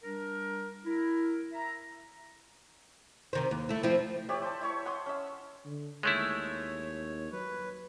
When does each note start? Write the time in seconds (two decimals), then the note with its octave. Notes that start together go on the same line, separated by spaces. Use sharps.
0.03 G3 D4 A#4
0.85 E4 A#4
1.53 E5 A#5
3.33 C3 D#3 C5
3.51 D#2
3.69 A3 E4
3.83 F3 C4 E4
4.29 G4 C#5 D5 E5
4.42 C5 A5
4.61 E4 C#5 C#6
4.85 F#5 C6 D#6
5.06 C#4 E5
5.66 D3
6.03 D#2 G#3 A3 E4 C#5
7.32 F#3 B4